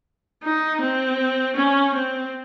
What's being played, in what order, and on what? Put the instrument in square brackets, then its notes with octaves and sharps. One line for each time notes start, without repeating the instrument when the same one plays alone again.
[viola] D#4
C4
C#4
C4